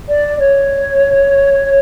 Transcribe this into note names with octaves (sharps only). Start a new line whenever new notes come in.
D5
C#5